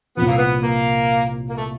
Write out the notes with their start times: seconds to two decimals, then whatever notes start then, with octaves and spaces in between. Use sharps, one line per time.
0.17 C2 A#2 F3 B3
0.27 A#3
0.37 B3
0.62 A#3
1.49 A#3
1.57 A3